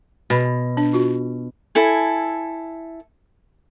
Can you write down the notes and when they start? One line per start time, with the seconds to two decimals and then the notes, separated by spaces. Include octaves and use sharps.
0.30 B2 B4 B5
0.77 D4
0.93 F4 F#4
1.75 E4 A4 G#5